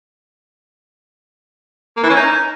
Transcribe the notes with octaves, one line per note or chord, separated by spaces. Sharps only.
A#3
E3
C#4
D#4